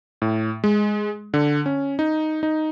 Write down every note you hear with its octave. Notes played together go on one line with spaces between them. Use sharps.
A2
G#3
D3
C#4
D#4
D#4